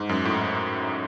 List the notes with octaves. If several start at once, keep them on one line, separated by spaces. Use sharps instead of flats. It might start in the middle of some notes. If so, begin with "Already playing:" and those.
Already playing: G#2
F#2
A2